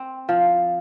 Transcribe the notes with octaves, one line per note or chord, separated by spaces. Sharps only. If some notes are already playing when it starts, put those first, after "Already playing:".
Already playing: C4
F3